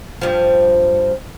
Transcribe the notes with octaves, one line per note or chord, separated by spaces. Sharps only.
G2 F3